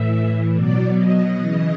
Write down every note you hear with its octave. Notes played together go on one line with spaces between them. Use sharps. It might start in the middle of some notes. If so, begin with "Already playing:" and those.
Already playing: A2 E3 E5
B2 F#3 D5
D#5
C#3 E3